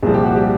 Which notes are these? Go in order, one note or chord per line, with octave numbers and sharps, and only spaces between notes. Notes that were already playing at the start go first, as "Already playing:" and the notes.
C2 A#2 F3 G#4
G4
F#4
G3 G4